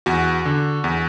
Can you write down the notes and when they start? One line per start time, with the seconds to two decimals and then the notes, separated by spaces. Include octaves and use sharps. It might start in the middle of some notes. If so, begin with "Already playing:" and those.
0.06 E2 F#4
0.45 D3
0.84 E2